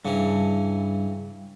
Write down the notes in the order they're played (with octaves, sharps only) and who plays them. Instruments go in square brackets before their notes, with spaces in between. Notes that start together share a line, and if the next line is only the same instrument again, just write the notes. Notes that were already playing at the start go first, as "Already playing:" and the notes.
[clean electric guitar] G2 [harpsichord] C#3 E3